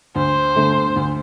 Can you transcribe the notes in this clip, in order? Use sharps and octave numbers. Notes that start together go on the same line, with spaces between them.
D2 C5
D3 A3
D2